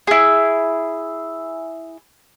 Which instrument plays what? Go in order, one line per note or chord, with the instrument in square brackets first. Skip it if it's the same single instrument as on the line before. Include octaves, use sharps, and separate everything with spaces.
[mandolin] E4 G#4